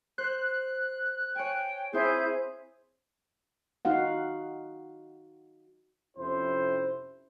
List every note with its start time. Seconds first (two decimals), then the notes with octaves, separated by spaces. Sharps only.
0.18 C5 F#6
1.36 C#5 G5 G#5
1.93 C4 E4 G#4 C5 G6
3.85 D#4 F#4 F5 F#5
6.17 F2 C3 C#4 E4 C5